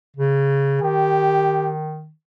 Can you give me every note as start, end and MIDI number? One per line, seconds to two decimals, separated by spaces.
0.17 0.81 49
0.82 2.11 51
0.82 1.72 67